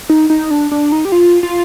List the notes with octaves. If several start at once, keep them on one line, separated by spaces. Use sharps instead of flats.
D#4
D#4
D4
D4
D#4
G4
F4
F4